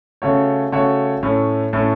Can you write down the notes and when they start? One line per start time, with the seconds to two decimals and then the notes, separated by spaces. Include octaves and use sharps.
0.22 C#3 A3 F#4 C#5
0.72 C#3 A3 F#4 C#5
1.23 A2 A3 C#4
1.73 A2 A3 C#4